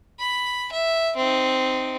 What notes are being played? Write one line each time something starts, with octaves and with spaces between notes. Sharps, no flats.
B5
E5
C4 D#4